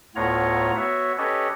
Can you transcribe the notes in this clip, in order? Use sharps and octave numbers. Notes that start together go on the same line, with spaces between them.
D2 A2 B3 F4 C#5 A#5
B3 F#4 C#5 E5
C#4 G4 A4 B4 C#5 D#5